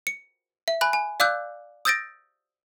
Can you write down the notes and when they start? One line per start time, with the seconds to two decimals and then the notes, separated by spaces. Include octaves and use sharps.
0.07 C#7
0.68 E5
0.81 G#5 B5 F#6
0.93 G#5
1.20 D5 F5 D6 E6 F#6 G6
1.85 D#6 E6 G6 A6 A#6 D7